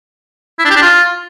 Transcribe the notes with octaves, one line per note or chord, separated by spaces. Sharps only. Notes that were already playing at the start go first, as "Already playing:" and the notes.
E4
D4
G4
D4
F4